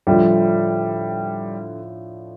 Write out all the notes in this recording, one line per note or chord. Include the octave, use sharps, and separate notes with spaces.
A2 D3 F3 G3 D4 F4